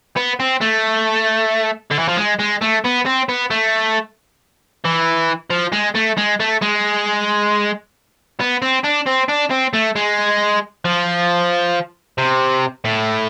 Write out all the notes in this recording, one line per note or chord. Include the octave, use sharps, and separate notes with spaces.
B3
C4
A3
D3
E3
F3
G#3
G#3
A3
B3
C4
B3
A3
E3
F3
G#3
A3
G#3
A3
G#3
B3
C4
D4
C4
D4
C4
A3
G#3
F3
C3
A2